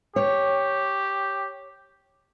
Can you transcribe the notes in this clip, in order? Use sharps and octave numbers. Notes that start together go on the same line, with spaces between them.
G4 C#5